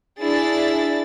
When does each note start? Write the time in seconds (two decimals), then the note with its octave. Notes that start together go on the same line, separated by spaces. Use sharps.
0.20 D4 E4 G#4 A6